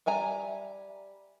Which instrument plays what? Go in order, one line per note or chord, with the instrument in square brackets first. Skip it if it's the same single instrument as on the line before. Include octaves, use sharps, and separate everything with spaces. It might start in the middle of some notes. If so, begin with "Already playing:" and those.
[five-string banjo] G3 E5 G#5 A#5